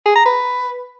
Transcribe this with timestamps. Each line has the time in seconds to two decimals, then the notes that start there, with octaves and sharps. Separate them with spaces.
0.06 G#4
0.15 A#5
0.25 B4